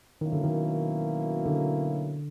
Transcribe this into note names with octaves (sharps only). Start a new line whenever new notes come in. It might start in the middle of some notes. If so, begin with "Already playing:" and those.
B2 D#3 F#3 A#3 C#4 E4
D3
D#3
D3